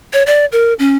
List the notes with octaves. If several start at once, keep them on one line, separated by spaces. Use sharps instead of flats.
C#5
D5
A#4
C#4